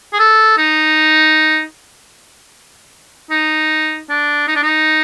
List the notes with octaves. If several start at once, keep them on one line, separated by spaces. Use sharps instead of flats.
G#4
A4
D#4
D#4
D4
D#4
D4
D#4